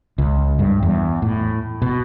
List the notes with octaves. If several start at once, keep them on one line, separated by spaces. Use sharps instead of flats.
C#2
G2
E2
A2
B2